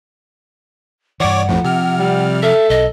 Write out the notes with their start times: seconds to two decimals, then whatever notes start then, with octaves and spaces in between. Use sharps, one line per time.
1.20 G2 E3 C#5 D5 F#5 D6
1.49 A1 F2 A2 F3
1.64 C3 F6
1.99 G3
2.42 A4 E5
2.70 B1 D#5